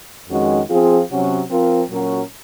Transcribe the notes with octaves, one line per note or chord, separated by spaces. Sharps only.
F2 D#3 G#3 C#4 F#4
F3 C4 F4 G#4
C3 F#3 C#4 F#4
F3 C4 F4 A#4
A#2 F#3 C#4 F#4 A#4